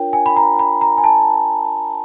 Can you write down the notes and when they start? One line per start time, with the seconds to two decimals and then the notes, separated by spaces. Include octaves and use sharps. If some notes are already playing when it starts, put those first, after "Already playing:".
Already playing: D4 F4 A#4 C#5 G5
0.13 G#5
0.26 B5
0.36 A#5
0.59 B5
0.81 A#5
0.98 G#5
1.04 A5